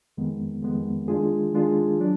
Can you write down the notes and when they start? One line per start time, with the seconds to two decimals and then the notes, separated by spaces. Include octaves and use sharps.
0.17 F2 D#3 G#3 B3
0.62 F2 D#3 G#3 B3
1.08 D#3 G#3 D4 F4 G#4
1.53 D#3 G#3 D4 F4 G#4
1.98 F#3 D4